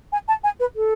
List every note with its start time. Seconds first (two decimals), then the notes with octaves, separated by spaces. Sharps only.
0.12 G#5
0.28 A5
0.44 G#5
0.60 B4
0.76 A4